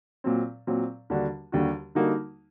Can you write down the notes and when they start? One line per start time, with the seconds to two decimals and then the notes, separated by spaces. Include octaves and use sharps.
0.24 A#2 F#3 C4
0.67 A#2 F#3 C4
1.10 D#2 D3 G3 D4 F#4
1.52 D#2 D3 G3 D4 F#4
1.95 D3 G3 A#3 D#4 F#4